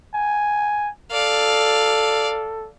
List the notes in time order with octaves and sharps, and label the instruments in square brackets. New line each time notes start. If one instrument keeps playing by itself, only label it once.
[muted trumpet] G#5
[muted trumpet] A4 [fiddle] D5 F5